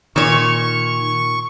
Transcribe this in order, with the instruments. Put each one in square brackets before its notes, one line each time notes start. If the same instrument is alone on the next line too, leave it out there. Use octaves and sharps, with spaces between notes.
[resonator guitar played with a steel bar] A#2 C#5 [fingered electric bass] D#3 [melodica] C#6